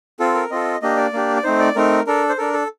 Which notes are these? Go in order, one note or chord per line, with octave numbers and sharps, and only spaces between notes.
C4 F4 A4
A#4
C4 F4 A4 D#5
A#3 D4 G4 D#5
D5
A#3 D4 G4
D5
A3 C4 D#4 C5
D5
A3 C4 D#4 A#4
D4 A4 A#4
C5
D4 A4 A#4
A4